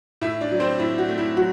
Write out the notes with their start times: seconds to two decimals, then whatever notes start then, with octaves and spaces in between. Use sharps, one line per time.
0.21 A2 E4 E5
0.41 D4 D5
0.51 F#3
0.60 C4 C5
0.79 A2 E4
0.98 F#4
1.08 A3
1.18 E4
1.36 F#3 F#4